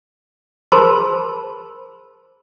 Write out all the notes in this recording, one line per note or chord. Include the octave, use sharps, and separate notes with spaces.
G#4 A#4 C5 A5 B5 C6